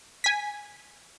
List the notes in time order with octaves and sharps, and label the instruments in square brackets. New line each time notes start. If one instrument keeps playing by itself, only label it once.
[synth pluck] G#5 B6